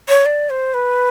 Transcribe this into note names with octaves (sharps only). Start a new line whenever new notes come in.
C#5
D5
C5
B4